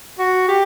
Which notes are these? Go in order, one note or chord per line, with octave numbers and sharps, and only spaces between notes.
F#4
G4